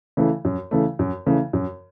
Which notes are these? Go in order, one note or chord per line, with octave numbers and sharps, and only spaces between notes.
C#3 E3 A3
F#2
C#3 E3 A3
F#2
C#3 E3 A3
F#2